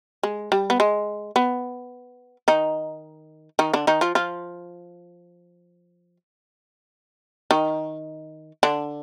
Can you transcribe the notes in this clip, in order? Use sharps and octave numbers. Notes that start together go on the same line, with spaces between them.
G#3
G3
B3
G#3
B3
D#3 D#4
D#3 D#4
D3 D4
D#3 D#4
F3 F4
F3 F4
D#3 D#4
D3 D4